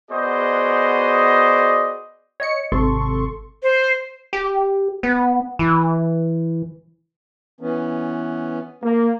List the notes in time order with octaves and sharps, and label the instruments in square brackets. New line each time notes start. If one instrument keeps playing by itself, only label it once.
[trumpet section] B3 F#4 G#4 C5 D5 D#5
[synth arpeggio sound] C#5 D#5 C#7
G#1 C3 A4 C6 C#6
[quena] C5
[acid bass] G4
B3
E3
[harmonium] E3 B3 C#4
[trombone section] A#3